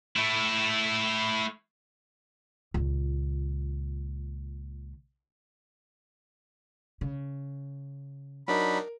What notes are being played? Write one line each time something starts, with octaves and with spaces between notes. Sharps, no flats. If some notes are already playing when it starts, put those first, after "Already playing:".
A3 E4
C#2 A#2
C#3
F#3 D4 D#4 A#4 B5